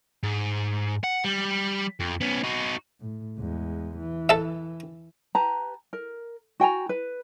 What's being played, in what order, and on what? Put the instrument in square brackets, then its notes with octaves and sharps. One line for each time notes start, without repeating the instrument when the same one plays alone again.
[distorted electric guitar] G#2
F#5
G3
F2
B3 C#4
D#4 F#4
[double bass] A2
E2 G#3
E3
[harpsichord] A4 E5
[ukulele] G4 B4 A5 A#5
A#4
F#4 G5 G#5 A#5
B4